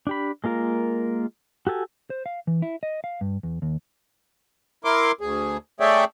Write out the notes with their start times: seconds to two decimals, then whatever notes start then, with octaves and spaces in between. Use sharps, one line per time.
0.07 D4 G4 B5
0.44 G#3 A#3 F4 A#4
1.67 F#4 G4 A4 G#5
2.10 C5
2.26 F5
2.47 E3
2.62 E4
2.83 D#5
3.04 F5
3.21 G2
3.43 E2
3.62 D#2
4.85 E4 A#4 C6 D6
5.21 D2 G#4
5.80 A3 G#4 C#5 D5 E5 G5